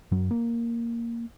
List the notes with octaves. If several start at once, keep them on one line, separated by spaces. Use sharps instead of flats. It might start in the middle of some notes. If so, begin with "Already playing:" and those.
F#2 F#3
A#3